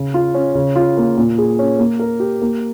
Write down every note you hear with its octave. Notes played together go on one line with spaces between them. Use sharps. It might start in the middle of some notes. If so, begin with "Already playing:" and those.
Already playing: C#3
F4
C#4
C#3
F4
A#3
A#2
G#4
C#4
A#3
A#4
G4
A#3